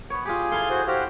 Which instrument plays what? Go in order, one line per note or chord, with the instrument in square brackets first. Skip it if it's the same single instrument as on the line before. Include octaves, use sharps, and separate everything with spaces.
[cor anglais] B3 [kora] C#5
[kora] F4 G4 [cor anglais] G#4
[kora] E4 A4 [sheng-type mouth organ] F5 C6
[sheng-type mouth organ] F#4 C5
[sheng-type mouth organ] F#4 G4 C5 [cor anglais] F5